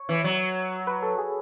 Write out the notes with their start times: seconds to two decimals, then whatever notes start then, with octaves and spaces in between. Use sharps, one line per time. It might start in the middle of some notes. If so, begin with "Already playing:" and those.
Already playing: C#5
0.09 E3
0.24 F#3
0.87 B4
1.03 A4
1.18 G#4